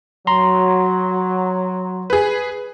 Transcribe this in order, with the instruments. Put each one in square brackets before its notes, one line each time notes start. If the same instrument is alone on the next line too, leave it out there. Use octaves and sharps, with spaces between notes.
[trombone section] F#3 [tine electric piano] A#5 C6
[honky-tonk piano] G#4 B4